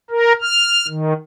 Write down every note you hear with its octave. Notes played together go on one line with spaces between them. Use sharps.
A#4
F6
D#3